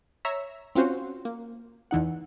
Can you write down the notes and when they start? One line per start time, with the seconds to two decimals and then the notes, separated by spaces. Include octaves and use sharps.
0.25 C#5 E5 A#5 E6 B6
0.75 C4 C#4 F4 F#4 C5
1.25 A#3
1.91 E2 E3 D#4 F#5